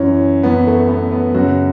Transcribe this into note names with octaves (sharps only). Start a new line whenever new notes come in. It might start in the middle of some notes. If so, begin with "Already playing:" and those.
Already playing: F#2 E3 C#4
F#2 E3 B3
A3
B3
B3
F#2 C#3 F#3 F#4